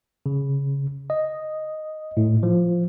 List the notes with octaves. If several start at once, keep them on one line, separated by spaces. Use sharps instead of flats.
C#3
D#5
A2
F3